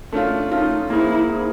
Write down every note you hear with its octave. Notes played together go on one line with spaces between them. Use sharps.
A3 C#4 D4 F4
A3 C#4 D#4 F4
A#3 D#4 E4 G#4 C5
A#3 D#4 G#4 C5